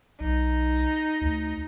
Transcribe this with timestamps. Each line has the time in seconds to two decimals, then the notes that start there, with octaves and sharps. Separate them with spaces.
0.20 B1 D#4
1.21 D2